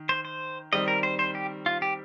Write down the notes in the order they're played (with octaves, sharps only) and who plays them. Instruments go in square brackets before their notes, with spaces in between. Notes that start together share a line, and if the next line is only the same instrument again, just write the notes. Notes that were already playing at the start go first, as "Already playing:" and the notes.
Already playing: [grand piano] D#3
[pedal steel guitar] C5
C5
[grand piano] D#3 G3 C4 [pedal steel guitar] D#5
[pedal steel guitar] A#4
C5
C5
G4
F4
G4